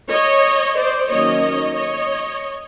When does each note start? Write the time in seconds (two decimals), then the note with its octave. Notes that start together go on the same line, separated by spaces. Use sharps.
0.11 C#5 D#5
0.77 C5 D5
1.09 D#3 F#3 A#3 C#4 C#5 D#5
1.75 C#5 D#5